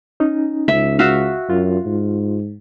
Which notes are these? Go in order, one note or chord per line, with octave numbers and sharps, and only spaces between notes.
C#4 D#4
C#2 E5
F#4 E5 F5
F#2 F4
G#2